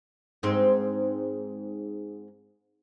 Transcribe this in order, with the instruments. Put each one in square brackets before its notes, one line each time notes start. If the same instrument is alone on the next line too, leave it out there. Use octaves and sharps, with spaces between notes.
[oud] G#2 C4